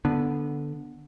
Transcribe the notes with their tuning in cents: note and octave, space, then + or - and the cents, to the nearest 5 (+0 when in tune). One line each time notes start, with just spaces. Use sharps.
D3 +0 B3 -5